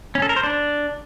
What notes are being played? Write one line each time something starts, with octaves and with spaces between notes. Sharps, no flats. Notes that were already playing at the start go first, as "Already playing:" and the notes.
C#4
A4
A#4
C5
D4